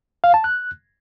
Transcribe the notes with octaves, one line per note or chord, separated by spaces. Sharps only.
F5
A5
F#6